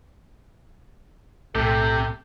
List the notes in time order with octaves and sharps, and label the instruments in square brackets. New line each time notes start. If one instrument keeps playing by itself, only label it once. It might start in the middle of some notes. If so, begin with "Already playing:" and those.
[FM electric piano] B1 A2 [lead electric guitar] C3 G4 [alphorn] A4